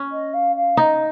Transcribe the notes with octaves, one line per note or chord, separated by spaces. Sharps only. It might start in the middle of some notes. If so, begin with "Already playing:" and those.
Already playing: C#4
D#5
F5
F5
D#4 D#5